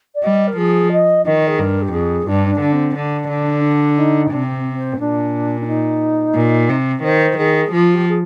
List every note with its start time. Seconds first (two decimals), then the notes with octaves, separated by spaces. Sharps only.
0.15 D5
0.23 G3 D#5
0.47 A#4
0.57 F3 G#4
0.92 D#5
1.25 D#3 D#5
1.47 G#4
1.59 G2 A#4
1.82 G4
1.93 F2 G#4
2.27 G2 D4
2.50 D4
2.61 D3
2.72 C4
2.95 D3 D4
3.29 D3
3.64 D4
3.97 D#4
4.31 C3 D4
4.44 C4
4.71 C4
4.99 A#2 D4
5.61 D4
5.67 D#4
6.35 A#2
6.69 C3
7.03 D#3 C5
7.37 D#3 G#4
7.72 F3 F4
7.94 G4
8.08 G#4